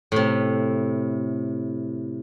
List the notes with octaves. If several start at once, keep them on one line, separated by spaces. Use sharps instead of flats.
A2 C3